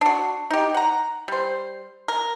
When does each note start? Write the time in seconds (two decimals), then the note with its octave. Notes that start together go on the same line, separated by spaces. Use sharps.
0.01 D4 F#4
0.50 D#4 G4
0.74 F#5 A#5
1.28 G3 C5
2.08 A#4